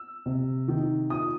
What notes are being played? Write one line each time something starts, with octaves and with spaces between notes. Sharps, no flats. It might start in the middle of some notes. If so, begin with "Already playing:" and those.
Already playing: E6
C3
D#3
A#2 D#6